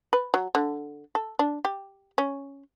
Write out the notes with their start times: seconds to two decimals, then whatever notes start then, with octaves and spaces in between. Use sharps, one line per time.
0.13 B4
0.34 F#3
0.55 D3
1.15 A4
1.39 D4
1.65 G4
2.18 C#4